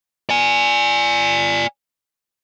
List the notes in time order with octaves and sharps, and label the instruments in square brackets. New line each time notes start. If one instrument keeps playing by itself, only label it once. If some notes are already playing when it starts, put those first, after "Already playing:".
[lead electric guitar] D5 G#5